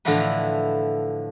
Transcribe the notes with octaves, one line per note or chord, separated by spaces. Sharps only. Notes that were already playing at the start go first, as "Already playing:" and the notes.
A2 D3 E3 F3 E4 B4